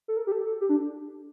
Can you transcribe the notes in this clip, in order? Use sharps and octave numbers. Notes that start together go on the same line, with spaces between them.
A4
A#4
G4
A4
A4
G4
D4